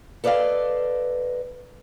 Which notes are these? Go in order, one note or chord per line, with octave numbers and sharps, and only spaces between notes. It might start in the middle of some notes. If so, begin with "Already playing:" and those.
A4 B4 D5 D#5 F5